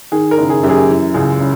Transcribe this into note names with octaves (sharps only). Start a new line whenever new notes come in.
D#3 G#4
A#4
F#1
G#4
F#2 G4
G#4
E3
C#2 G#4
C#3